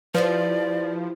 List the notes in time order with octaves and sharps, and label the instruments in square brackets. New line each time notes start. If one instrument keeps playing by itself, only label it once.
[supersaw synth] F3 [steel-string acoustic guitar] E4 F4 G4 [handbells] B4 [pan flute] D5